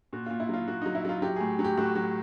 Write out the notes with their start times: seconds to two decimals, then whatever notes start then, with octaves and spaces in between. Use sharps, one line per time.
0.13 A#2 F#4
0.26 A#2 F4
0.40 E4
0.49 F#3 F4
0.68 A#2 F#4
0.81 F#3 D#4
0.95 E4
1.05 F#3 F4
1.22 F#3 G4
1.36 A2 G#4
1.59 F#3
1.64 G4
1.78 A2 F#4
1.95 F#3